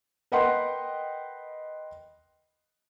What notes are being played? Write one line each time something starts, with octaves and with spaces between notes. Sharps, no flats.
A#4 B4 D#5 F#5 G5 C6